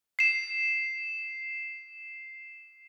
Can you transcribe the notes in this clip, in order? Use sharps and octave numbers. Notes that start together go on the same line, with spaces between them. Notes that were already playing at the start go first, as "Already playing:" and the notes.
C7 E7